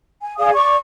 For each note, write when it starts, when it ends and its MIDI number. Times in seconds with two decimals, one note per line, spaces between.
0.21 0.37 80
0.38 0.53 68
0.38 0.53 74
0.38 0.53 77
0.38 0.53 87
0.54 0.75 74
0.54 0.75 85
0.54 0.75 86